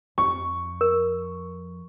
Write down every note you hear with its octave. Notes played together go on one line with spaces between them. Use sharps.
F2 C#6
A#4